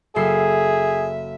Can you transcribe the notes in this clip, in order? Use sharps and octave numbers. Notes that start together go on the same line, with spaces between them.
F#1 G#4 A4 E5 C7